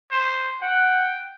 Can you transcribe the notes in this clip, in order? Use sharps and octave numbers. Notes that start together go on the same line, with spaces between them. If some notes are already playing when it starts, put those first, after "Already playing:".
C5
F#5 G5